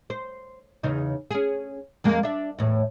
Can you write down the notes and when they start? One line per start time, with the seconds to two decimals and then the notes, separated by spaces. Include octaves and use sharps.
0.10 C5
0.83 E2 C#3 D#4
1.31 C#4 G#4
2.04 F2 G#3 A#3
2.23 D4 E5
2.59 E2 A2